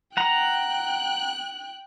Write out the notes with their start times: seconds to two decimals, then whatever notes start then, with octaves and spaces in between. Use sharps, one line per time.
0.17 F#5 G5 A#5 F#6